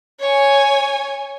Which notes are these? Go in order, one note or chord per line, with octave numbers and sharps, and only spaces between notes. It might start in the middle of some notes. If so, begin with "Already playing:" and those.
C#5 G#5